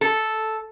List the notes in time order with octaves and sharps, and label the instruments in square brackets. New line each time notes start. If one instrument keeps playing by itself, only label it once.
[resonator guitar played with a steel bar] A4